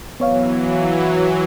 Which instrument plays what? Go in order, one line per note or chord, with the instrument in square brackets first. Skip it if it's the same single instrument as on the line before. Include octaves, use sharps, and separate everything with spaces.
[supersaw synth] E3 F#3 [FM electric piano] B3 C#5 F5